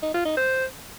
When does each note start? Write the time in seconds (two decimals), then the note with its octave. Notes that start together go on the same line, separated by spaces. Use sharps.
0.02 D#4
0.14 F4
0.25 D#4
0.37 C5